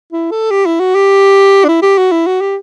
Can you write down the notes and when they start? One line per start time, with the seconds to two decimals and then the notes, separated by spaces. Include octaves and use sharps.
0.12 E4
0.31 A4
0.50 G4
0.66 E4
0.80 F#4
0.95 G4
1.64 D4
1.68 E4
1.82 G4
1.98 F#4
2.12 E4
2.26 F#4
2.41 G4